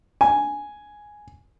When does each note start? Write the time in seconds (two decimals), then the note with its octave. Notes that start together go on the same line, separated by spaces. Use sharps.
0.21 G#5